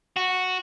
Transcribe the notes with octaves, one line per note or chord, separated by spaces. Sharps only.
F#4